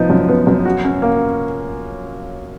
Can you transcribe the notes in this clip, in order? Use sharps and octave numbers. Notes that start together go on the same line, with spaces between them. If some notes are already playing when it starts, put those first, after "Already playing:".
Already playing: F3 B3 D#4
F#2
B3
F#2
F#4
C#4
A#3